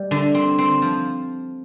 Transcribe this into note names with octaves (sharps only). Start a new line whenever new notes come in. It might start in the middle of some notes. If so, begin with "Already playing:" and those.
Already playing: G3
D3
C4
C4
F3